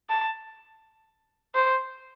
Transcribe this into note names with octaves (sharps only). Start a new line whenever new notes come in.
A5
C5